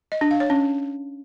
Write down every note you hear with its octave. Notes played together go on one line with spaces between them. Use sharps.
D#5
D4
F5
C#5
C#4